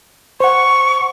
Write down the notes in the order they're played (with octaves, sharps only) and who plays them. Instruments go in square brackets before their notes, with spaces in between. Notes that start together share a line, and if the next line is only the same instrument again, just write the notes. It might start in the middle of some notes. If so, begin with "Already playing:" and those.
[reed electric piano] C5 F#5 [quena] C#6